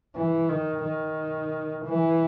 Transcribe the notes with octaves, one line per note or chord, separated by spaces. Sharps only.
E3
D#3
D#3
E3